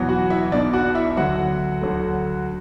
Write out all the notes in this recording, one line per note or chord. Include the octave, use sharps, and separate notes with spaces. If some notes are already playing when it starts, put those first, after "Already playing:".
Already playing: E2 B2 F#3 B3
F#4 F#5
E4 E5
B1 B2 B3 D4 D5
F#4 F#5
E4 E5
D2 D3 F#3 F#4 F#5
D2 D3 F#3 A3